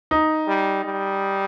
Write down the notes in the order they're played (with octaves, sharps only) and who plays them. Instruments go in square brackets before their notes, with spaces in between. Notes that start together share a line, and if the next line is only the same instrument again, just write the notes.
[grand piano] D#4
[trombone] G3
G3